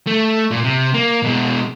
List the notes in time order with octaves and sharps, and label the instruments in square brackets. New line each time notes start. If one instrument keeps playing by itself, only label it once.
[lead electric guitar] A3
A#2
C3
A#3
B2 G#3